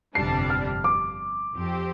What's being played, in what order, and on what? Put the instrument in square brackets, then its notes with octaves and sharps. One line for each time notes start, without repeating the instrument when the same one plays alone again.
[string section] G1 F2 C3 G3 D4 [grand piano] C7
[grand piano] F6
D6
[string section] F2 F3 C4 G4